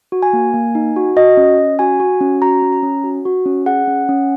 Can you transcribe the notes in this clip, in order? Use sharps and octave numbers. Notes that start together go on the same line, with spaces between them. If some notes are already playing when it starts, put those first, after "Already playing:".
F#4
G#5
A#3
A#3
D#4
F#4
F#4 D#5
C#4
C#4
F#4 G#5
F#4
C#4
F#4 A#5
C#4
A#5
C#4
F#4
F#4
C#4
G#4 F#5
C#4
C#4